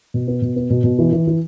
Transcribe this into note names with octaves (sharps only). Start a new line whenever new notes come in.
B2
B3
B2
B3
B2
B2
E3
E3
E3